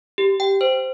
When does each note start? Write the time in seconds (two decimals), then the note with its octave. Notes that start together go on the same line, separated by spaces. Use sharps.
0.18 G4
0.40 G5
0.61 C5